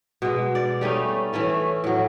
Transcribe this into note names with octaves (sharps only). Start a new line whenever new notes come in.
B2 G#3
D5
G3 A3 C#4 D#4
E3 A3 C#4 A4
A2 F#3